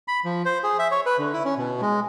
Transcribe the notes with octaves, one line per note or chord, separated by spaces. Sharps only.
B5
F3
C5
G#4
E5
C#5
B4
D3
E4
C#4
B2
G#3